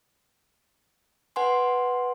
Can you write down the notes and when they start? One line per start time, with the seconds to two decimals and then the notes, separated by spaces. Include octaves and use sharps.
1.36 B4 F#5 G#5 C6